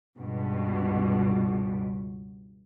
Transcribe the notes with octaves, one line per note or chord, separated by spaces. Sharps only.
C#2 G2 B2